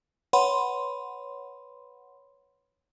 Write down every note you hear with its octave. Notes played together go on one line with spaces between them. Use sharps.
B4 C#5 F#5 B5 C6